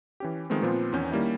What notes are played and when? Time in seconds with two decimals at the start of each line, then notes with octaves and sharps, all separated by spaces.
0.20 E3 C#4 G4
0.50 D#3 F3 G#3 A3 B3 C4
0.62 A#2 F3 B3 C4 F4
0.93 E2 D#3 C#4 G6
1.11 D#3 G3 A#3 C#4 E4